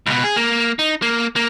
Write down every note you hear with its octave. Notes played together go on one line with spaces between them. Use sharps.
C#2 B2
G#4
A#3
D#4
A#3
A#3